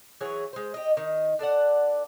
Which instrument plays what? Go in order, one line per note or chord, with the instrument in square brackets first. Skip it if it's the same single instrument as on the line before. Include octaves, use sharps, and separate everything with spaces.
[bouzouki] E3 F#3 G#4 C#5
G#3 C5
G4 D#5
D#3 D#4
D4 A4 D5 F#5